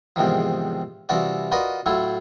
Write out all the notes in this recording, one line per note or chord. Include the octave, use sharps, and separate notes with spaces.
E2 G#2 C3 D#3 F3
C2 E3 F4 F#4 D5
F4 F#4 A#4 B4 D5 D#5
A2 F#3 A3 E4 F4